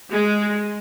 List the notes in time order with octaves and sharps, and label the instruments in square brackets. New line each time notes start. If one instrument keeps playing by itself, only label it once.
[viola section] G#3